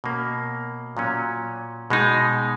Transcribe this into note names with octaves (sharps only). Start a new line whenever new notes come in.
B2 A#3 C#4
A#2 F#3 C#4
B2 G#3 D#4